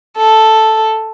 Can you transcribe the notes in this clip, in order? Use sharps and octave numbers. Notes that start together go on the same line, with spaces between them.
A4